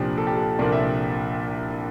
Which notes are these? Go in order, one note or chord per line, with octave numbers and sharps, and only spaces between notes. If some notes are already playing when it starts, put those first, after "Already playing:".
Already playing: C2 A#2 F3 A#3 D4 G4
A4
G4
A4
C2 A#2 F3 A#3 D4 D5
E5